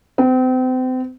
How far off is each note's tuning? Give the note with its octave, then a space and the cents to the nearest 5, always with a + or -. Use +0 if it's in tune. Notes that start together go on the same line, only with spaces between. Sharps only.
C4 -35